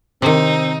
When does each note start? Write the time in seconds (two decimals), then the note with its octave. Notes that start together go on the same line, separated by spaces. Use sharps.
0.22 C3 D#3 C4 D#4